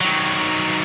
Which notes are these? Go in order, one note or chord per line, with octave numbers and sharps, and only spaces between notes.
D#3 F#3